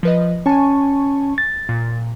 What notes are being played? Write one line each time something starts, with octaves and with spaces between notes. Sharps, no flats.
F3 B4 D#5
C#4 G#5 A5 C#6
A6
A#2